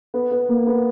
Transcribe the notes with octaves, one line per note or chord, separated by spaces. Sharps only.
B3
B3
A#3
B3